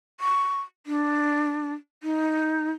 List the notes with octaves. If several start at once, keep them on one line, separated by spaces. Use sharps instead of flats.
C#6
D4
D#4